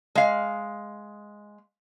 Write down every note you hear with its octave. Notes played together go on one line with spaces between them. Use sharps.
G#3 F5